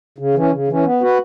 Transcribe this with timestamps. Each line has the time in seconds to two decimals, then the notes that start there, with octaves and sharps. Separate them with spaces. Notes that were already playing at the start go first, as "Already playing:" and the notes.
0.18 C#3
0.34 E3 C#4
0.52 C#3
0.68 E3 C#4
0.86 B3
1.02 F#4 B4